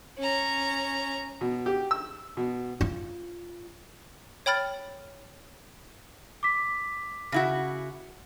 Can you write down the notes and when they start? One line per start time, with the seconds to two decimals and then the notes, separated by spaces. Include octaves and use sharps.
0.18 C#4 A#5
1.41 B2
1.66 G4
1.91 E6
2.37 B2
2.81 F4
4.46 C#5 G5 B5 F6 A6
6.43 D6 B6
7.32 C#3 E4 F#4